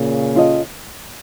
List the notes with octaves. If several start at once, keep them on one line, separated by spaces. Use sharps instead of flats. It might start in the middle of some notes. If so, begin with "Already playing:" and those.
Already playing: A#2 C#3
C#4 F4 A4 D#5